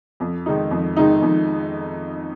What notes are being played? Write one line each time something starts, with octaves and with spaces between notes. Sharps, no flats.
F2
D#3 G#3 D#4
F2
D#3 G#3 D#4
F2